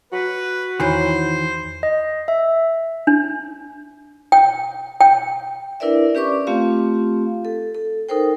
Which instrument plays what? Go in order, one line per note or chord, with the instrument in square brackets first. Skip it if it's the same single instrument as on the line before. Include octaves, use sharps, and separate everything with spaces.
[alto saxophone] F#4 [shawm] B4
[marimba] E2 C#5 B5 [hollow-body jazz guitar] D#3 E3 [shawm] C5
[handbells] D#5
E5
[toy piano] D4
G5
G5
[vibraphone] D4 E4 A#4 B4 D5 E5
C#4 G4 B4 D5 C#6 D6
A3 C4 F4 G4 F5
A4
A4
D#4 A4 A#4 C5 G5